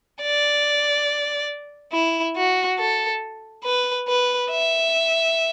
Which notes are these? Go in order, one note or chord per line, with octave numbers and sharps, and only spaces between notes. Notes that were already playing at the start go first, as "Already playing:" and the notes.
D5
E4
F#4
A4
B4
B4
E5